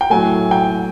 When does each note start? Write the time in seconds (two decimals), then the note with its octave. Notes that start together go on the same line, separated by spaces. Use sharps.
0.01 G5
0.10 A2 F#3 A3 G#5
0.51 G5